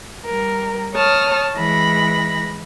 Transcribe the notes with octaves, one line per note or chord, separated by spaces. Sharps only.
G3 A#4
C#5 A5 D#6 F6
E3 G#3 B5 A#6